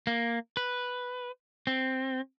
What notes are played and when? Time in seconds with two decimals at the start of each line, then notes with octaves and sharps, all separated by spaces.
0.07 A#3
0.57 B4
1.67 C4